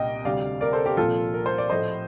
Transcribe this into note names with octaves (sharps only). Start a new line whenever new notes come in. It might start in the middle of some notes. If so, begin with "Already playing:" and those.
Already playing: C2 A#2 D#5 G5
D2 C3 G3 D5 F5
A#4 D5
A4 C5
G4 A#4
C2 A#2 F3 F4 A4
A#4
C5
D5
A2 F3 A3 C5 D#5